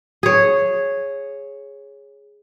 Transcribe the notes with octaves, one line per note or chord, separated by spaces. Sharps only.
G#4 C#5